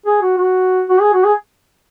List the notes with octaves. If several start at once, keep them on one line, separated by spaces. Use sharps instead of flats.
G#4
F#4
F#4
F#4
G#4
F#4
G#4